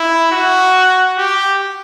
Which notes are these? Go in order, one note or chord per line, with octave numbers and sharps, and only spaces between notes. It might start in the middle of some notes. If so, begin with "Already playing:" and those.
Already playing: E4
F#4
G4